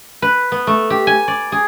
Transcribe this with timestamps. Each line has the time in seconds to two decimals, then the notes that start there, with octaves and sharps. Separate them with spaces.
0.22 B4
0.52 B3
0.67 A3
0.90 G4
1.07 G#5
1.28 D5
1.52 G#4